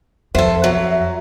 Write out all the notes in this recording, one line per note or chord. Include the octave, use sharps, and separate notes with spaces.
F2 A4 C5 E5
F#3